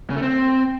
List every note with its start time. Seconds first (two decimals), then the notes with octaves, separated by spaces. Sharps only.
0.10 C#3
0.16 A3
0.22 C4